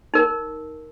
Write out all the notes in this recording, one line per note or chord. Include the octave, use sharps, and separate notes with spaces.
D#4 A#4